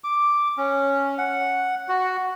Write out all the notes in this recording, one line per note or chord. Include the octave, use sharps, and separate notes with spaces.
D6
C#4
F#5
F#4